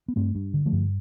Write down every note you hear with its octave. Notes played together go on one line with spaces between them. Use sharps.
B3
G2 A3 C4
G2
D3
F3 A3
G2